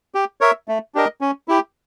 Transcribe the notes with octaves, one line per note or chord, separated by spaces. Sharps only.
G4
A#4 C#5 E5
A3
D4 G4 A#4 D#5
C#4
E4 G4